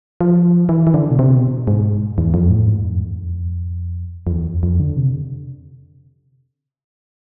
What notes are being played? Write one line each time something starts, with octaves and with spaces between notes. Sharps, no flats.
F3
E3
E3
D3
B2
C3
B2
G#2
E2
F2
A2
G#2
F2
E2
F2
F2
E2
F2
F2
D3
C3